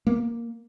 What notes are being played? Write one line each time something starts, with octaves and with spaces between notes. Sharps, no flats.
A#3